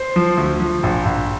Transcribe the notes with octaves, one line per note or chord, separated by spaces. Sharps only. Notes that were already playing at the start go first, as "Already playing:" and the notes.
Already playing: C5
F3
D2
F3
A#1
A#1